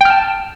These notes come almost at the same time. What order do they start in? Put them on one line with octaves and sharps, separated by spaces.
G5 F6 A5